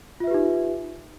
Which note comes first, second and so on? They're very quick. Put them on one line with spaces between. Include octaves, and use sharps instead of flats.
F4 E5 B4 G4 D#4